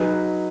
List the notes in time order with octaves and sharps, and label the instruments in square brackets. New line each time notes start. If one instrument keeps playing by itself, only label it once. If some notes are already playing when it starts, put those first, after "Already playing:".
Already playing: [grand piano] F#3 D#4 G#4 B4